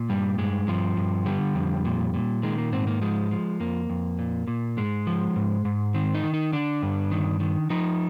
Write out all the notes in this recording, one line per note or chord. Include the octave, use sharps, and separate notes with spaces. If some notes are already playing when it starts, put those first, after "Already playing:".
Already playing: A#2
G2 G3
G2 G#3
G2 F3
G2
D3 G3
F2
A#2
A#2
D#3 G#3
A#3
G#2 C4
A#3
F3 G#3
F3
F2 A#3
F2
A#2
A#2
G#2 G#3
F3
G#2
G#2
D#3 C4
D#4
D#3
D#4
D3 D4
G2
D#3
D#3
F3 D#4